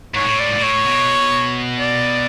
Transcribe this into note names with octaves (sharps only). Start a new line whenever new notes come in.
G#2 C#5
A2
D5
G#2
A2
C#5
B2
D5